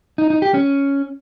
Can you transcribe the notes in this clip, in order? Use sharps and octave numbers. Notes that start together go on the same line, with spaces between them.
D#4
D#4
G4
C#4